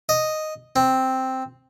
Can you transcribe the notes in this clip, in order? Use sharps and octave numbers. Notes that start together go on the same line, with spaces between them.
D#5
C4